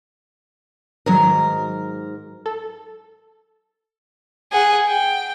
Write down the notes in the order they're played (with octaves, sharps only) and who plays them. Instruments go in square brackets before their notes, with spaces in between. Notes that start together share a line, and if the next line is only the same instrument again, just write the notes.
[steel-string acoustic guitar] G#2 A#4 [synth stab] D#3 F#3
[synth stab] A4
[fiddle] G#4 F#5
G5